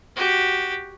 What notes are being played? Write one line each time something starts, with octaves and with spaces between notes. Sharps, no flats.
F#4 G4